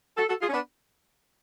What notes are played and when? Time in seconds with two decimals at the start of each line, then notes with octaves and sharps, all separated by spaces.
0.17 F#4 A4
0.29 F#4 A4
0.41 F4 G#4
0.48 C#4
0.53 B3 D4